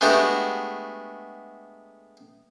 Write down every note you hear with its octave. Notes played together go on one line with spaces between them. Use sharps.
G#3 A3 B3 D4 F#4 G4